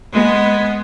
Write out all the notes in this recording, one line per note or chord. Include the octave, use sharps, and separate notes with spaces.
G#3 B3